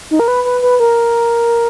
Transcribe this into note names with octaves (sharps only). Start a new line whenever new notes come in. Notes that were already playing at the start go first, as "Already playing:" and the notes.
D#4
A#4
B4
B4
B4
A#4